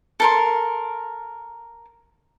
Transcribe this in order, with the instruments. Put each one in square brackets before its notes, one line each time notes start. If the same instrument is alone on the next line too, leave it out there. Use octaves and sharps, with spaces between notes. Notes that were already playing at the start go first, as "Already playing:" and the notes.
[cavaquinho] A4 A#4 C6